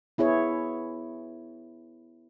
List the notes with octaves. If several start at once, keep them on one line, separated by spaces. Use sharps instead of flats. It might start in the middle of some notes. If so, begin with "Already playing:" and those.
B3 E4 G#4 C#5